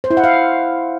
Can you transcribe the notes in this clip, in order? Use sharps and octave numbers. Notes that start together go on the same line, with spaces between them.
C5
E4
F#5
F5